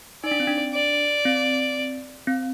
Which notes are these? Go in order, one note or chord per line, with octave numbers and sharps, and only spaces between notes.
D#4 D5
D4
C4
D4
D5
C4
C4